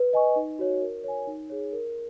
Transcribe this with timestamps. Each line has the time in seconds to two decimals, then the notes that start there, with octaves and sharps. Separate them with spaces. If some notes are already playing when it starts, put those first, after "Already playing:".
Already playing: B4
0.13 D#5 G#5 C#6
0.36 D#4
0.59 F#4 C#5
0.82 A#4
1.04 C#5 G#5
1.27 D#4
1.50 G#4 C#5
1.73 A#4